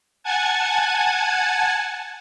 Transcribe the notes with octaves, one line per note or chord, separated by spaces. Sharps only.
F#5 G#5 A5 G#6